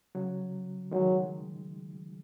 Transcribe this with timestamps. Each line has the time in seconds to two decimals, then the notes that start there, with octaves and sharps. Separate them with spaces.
0.15 C#3 F#3
0.91 D#3 F#3 G#3